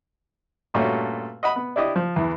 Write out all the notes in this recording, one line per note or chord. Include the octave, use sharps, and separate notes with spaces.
G2 A#2 A3 C#4 F#4
D#5 F#5 B5
B3
D4 E4 G4 D#5
F3
E2 E3